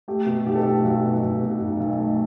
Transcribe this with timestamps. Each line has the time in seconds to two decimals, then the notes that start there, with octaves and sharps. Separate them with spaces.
0.08 A3 G4
0.26 B2
0.46 B1 G4
0.55 A4
0.63 A3 G4
0.84 B1 F#4
1.04 B2
1.23 B1
1.42 B2
1.61 B1
1.80 B1
1.99 A3